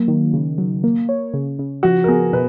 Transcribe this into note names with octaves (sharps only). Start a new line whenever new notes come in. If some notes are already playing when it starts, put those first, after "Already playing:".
Already playing: F#3 A#3
D#3
C#3
F#3
A#3
C#5
C#3
C#3
F3 F#4
A#4
B3 G#4
B2 B4